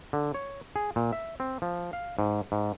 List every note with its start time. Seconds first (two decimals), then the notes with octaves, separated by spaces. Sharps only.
0.13 D3
0.34 C#5
0.76 G#4
0.96 A#2
1.13 E5
1.40 C4
1.62 F3
1.93 F5
2.19 G#2
2.52 G#2